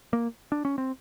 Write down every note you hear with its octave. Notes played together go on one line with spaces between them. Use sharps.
A#3
D4
C#4
C4